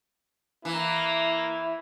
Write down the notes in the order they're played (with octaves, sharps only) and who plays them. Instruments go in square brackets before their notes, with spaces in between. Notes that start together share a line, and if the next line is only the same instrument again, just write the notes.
[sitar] E3 [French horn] A#3 [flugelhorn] E4